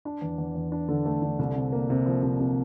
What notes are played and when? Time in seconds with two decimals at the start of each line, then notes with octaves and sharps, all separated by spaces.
0.05 D4
0.22 E2
0.38 E2
0.55 E2
0.72 D4
0.89 D3
1.06 A3
1.22 D3
1.39 C2
1.56 C3
1.72 A#3
1.90 C3
2.06 F3
2.23 C3
2.39 C3